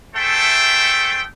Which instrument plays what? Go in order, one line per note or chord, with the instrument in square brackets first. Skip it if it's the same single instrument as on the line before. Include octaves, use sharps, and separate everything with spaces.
[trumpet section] A3 G#4 A4 C5 E5 G5